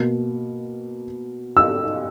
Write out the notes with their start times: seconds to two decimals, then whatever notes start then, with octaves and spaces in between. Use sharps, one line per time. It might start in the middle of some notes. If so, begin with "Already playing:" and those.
Already playing: B2 A#3
1.57 E6